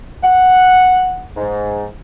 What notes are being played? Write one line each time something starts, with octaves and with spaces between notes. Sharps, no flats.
F#5
G#2